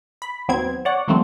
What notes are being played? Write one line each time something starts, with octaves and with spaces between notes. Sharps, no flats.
B5
D#2 F#3 B3 C4 G#6
C#5 D5 F#5
D#3 F3 G3 A3 A#3 C4